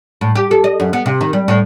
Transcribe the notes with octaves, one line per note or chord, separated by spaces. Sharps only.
A2
G4
A4
D#5
F#2
B3
C3
D#3
G3
A2